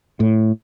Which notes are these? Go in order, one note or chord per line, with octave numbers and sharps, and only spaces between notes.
A2